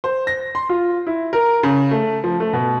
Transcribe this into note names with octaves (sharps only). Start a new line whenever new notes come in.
C5
A#6
C6
F4
E4
A#4
C#3
A3
F3
A3
B2